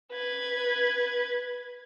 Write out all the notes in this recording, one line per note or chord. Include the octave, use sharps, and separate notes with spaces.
B4 G#6